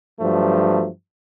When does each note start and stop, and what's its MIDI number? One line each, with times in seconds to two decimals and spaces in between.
0.20 0.88 43
0.20 0.88 53
0.20 0.88 54
0.20 0.88 57